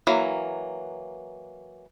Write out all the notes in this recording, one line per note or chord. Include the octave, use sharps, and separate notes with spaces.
E3 F#3 A#3